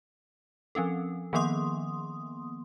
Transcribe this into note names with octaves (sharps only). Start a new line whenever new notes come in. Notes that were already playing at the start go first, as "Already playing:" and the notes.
F3 C4 C#4 A4
D#3 F3 A#3 B3 C6 D#6